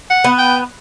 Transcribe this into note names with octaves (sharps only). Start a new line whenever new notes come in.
F#5
B3
G5